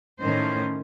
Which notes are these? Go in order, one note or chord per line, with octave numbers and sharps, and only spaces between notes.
A2 D#3 C#4 C5